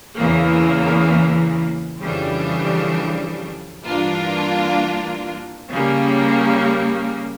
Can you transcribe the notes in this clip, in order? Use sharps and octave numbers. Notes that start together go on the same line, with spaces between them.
E2 C#3 E3 A#3
F2 C#3 E3 G3 D4
G2 E3 A#3 D4 F4
C#3 G3 A#3